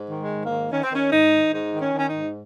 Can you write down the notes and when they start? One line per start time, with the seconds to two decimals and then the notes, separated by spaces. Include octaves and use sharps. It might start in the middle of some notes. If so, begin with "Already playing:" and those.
Already playing: G#2
0.10 D#3
0.17 G#3
0.31 G#2
0.44 A#3
0.51 D#3
0.72 D#3 C#4
0.84 C4
0.92 D#3 C#4
1.12 G#2 D#4
1.32 D#3
1.53 G#2 D#4
1.73 D#3
1.80 C#4
1.94 D#3
1.99 C#4
2.08 D#4
2.14 G#2